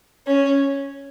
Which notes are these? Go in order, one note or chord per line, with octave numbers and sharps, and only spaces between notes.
C#4